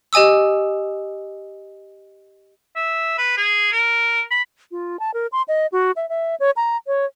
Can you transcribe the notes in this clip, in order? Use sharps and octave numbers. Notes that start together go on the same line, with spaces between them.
G4 D#5 G#5 D#6 E6
E5
B4
G#4
A#4
B5
F4
A5
A#4
C6
D#5
F#4
E5
E5
C#5
A#5
C#5